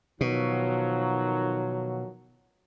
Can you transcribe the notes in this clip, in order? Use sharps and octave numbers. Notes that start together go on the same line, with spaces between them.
B2 D#3 F3 F#3